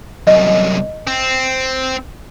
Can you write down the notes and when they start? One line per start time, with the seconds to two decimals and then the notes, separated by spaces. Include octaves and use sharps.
0.27 C2 F#2 D#5
1.07 C4